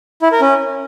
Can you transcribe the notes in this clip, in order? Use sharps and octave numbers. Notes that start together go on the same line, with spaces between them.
E4
A#4
C#4